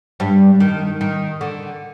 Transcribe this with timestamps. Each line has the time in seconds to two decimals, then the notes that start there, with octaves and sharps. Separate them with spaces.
0.20 G2 G3
0.60 D#3
1.01 D#3
1.41 D3